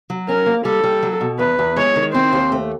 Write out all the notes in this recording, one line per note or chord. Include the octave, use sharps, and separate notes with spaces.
F#3
C#4 A#4
A#3
G3 A4
G3
F#3
B2
E2 B4
E2
G#3 C#5
D#3
C4 C5
D#2
A3